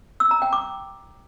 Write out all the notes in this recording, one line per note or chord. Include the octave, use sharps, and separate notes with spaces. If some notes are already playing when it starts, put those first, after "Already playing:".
E6
A#5
G5
D6